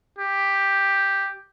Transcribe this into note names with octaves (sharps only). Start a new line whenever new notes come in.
G4